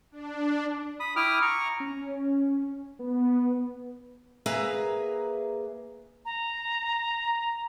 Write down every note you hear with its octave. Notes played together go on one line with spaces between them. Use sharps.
D4
B5 D#6
E4 G5 D6 D#6 F6
A#5 C#6
C#4
B3
A#3 G#4 B4 E5 A#5
A#5